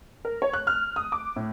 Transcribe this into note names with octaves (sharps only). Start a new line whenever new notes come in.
A#4
C#5
F#6
F6
D#6
D6
A2